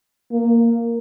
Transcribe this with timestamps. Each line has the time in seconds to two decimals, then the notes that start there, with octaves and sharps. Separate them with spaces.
0.32 A#3